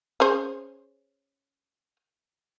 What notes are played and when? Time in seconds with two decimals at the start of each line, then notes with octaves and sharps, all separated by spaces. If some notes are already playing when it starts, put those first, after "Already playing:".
0.20 C#4 G#4 C5